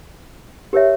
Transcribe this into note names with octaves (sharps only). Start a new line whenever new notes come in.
G4 A#4 C#5 E5